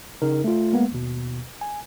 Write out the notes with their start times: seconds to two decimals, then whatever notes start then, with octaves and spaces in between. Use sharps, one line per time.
0.22 C#3 D#4 A#4
0.44 A3 F4
0.73 G#3 A#3 B3
0.92 D#2 B2
1.61 G#5